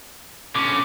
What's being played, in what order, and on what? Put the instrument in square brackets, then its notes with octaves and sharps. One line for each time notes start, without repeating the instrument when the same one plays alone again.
[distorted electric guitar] D3 C#4 [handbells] D6